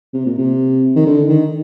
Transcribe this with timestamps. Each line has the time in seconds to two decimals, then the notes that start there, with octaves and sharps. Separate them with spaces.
0.14 C3
0.26 A#2
0.38 C3
0.96 D#3
1.06 D3
1.29 D#3